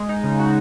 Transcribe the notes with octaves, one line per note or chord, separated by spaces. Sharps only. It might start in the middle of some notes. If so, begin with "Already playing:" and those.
Already playing: G#3
D#4
C#3
F#4